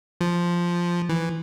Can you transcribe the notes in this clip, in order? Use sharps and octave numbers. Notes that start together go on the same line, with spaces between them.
F3
E3